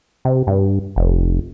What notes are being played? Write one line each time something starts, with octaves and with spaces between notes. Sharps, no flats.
C3
G2
F1